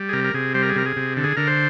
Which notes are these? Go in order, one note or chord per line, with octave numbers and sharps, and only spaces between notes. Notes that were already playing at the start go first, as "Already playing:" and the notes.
Already playing: G3
G#4
C3 A#4
A#4
C3 G#4
G3 C5
A#4
G#4
C3 A#4
G#4
C3
D3
G#4
D3 A#4
C5